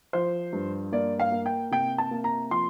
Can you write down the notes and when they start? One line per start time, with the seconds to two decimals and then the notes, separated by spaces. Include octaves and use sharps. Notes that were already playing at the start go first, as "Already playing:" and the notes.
0.13 F3 C5
0.53 G2
0.92 A#3 D5
1.20 F5
1.32 A#3
1.46 G5
1.71 C3 G5
1.98 A5
2.11 A#3
2.24 A#5
2.51 F3 C6